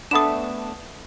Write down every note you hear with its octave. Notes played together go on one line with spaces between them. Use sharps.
A3 B3 D4 D#6 E7